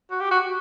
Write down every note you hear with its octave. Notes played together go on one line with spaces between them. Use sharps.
F#4
G4
F#4